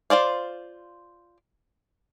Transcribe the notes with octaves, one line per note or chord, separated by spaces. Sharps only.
F4 C5 D5 F5